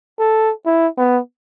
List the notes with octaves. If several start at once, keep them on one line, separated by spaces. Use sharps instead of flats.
A4
E4
B3